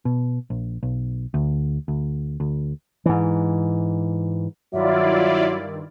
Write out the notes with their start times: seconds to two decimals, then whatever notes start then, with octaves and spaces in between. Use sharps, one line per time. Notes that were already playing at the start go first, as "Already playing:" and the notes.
0.05 B2
0.50 A#1
0.83 B1
1.34 D2
1.88 D2
2.40 D2
3.06 G#2 E3
4.73 G2 D#3 F#3 E4 F4 D5 E5